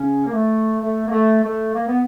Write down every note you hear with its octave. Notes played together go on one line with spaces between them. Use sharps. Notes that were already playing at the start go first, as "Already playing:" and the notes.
Already playing: C#3 C#4
A#3
A3
A3
A#3
A3
A3
A#3
B3